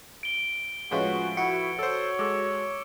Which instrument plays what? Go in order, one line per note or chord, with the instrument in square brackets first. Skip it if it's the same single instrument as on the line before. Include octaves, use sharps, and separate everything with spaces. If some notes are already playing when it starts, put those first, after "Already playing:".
[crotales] D7 G7
[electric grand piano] A2 F3 B4 [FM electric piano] G#3 C#4 F4 [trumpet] F#4
[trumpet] E4 [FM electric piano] F#4 [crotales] C#7
[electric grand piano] A4 C5 [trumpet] C#5 [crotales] E6
[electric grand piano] G#3 A4 [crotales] D6 E6